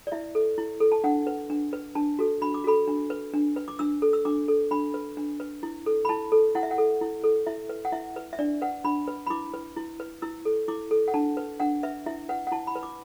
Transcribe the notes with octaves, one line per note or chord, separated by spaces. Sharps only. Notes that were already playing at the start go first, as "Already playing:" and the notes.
D5
E4 E5
A4
E4
A4
A5
D4 F#5
B4
D4
B4
D4 A5
F#4 A4
D4 B5
D6
F#4 A4 B5
D4
B4
D4
B4
D6
D4 E6
A4
E6
D4 D6
A4
D4 B5
B4
D4
B4
E4
A4
B5
E4 A5
A4
E4 F#5
E5
F#5
A4
E4
A4
E4 E5
B4
F#5
E4 E5
B4
E5
D4 D5
B4 F#5
D4 B5
B4
B5
E4 D6
B4
E4
B4
E4 E6
A4
E4 D6
A4
F#5
D4 A5
B4
D4 F#5
B4 E5
E4 E5
B4 F#5
F#5
E4 A5
B5
B4
D6